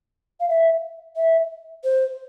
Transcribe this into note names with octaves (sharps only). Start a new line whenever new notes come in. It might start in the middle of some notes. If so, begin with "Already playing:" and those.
F5
E5
E5
C5